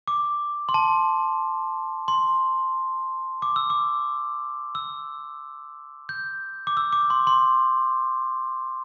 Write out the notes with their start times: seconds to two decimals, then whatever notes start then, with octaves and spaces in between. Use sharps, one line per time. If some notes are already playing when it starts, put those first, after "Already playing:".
0.08 D6
0.69 C6
0.74 A5
2.08 C6
3.42 D6
3.56 E6
3.70 D6
4.75 E6
6.09 G6
6.67 D6
6.77 E6
6.93 D6
7.10 C6
7.27 C6